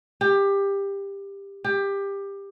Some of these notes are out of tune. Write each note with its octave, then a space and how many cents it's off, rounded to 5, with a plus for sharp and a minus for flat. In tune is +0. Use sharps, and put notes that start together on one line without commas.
G4 +20
G4 +20